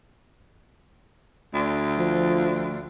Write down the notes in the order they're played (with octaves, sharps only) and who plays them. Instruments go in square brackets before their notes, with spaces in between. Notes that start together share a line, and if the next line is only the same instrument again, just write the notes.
[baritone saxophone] D2
[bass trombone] F3